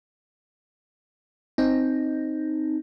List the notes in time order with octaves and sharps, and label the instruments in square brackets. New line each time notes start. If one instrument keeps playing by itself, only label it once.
[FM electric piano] C4 D#4